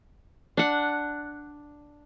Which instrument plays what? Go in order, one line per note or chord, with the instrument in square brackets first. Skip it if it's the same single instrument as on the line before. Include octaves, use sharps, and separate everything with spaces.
[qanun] D4 F#5